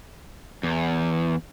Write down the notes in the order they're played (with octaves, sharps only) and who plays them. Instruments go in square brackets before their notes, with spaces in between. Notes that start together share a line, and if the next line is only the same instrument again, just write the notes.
[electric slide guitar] E2